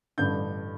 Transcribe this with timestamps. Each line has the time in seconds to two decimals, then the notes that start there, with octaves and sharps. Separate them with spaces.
0.18 A1 G2 D3 G6